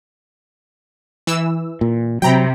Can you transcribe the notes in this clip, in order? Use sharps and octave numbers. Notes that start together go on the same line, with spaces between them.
E3 E6
A#2
C3 F#3 G5 A#5 B5